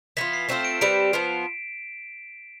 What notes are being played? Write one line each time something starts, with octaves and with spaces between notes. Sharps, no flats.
E3 B3 F4 B6
C7
A3 C4 F4 C5 E7
D7
G3 C4 G4 B4 D7
F3 B3 F4